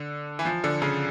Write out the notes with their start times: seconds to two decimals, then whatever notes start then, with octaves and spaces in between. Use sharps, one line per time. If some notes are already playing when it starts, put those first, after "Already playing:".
Already playing: D3
0.39 E3
0.45 F3
0.64 D3
0.82 C#3